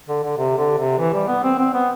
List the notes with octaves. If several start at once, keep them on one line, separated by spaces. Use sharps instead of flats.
D3
D3
C3
D3
C3
E3
G3
B3
C4
C4
B3